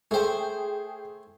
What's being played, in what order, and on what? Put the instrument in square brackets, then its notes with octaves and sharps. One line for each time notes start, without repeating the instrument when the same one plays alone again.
[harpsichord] A3 C5 [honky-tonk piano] G#4 G5